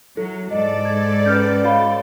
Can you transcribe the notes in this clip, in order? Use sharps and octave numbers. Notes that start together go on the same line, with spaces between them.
F#3 E4 A4
G#2 A4 D5 D#5
G#6
C#4 B4 F6 G6
F#4 C#5 D#5 F5 B5